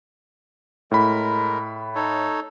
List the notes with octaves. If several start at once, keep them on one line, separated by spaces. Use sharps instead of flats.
A2 G#3 A#4 B5
D#4 A4 C#5